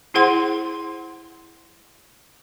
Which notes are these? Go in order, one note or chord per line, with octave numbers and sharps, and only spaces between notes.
E4 G#4 C5 F#5 C6